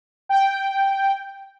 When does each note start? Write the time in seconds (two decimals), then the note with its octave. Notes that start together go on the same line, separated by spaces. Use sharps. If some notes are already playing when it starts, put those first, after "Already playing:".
0.29 G5